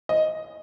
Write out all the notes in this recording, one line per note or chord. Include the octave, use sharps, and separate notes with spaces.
D#5